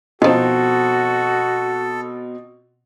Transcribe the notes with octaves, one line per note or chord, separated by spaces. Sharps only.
B2 D#3 F3 C4 F#4 A4